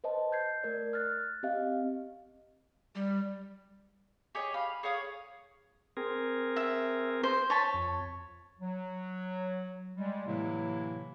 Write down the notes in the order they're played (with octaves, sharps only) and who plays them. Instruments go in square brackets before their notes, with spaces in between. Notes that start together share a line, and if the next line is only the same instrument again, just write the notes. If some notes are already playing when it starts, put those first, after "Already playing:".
[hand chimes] B4 C5 D#5 A5
G6 G#6 C7
A3 A#4 D5
F6 F#6 A6
C4 G4 D#5 F5
[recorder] G3
[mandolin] G4 G#4 C#5 D#5
F5 B5
G#4 C#5 F5 D#6
[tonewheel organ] C4 G#4 A#4
[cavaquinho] E5
C5
C#5 A5 B5
[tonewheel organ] F2
[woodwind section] F#3
G3 G#3
A2 C3 E3 F#3 A#3 E4